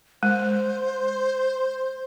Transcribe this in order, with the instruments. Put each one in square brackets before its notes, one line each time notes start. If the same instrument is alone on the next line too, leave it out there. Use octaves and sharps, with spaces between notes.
[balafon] G#3 [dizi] C5